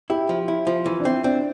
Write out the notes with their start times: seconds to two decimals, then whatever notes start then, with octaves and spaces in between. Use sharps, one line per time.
0.10 E4 G4
0.29 F3
0.48 E4
0.67 F3
0.86 E3 F4
1.00 D4
1.05 C4 E4
1.24 C4 D4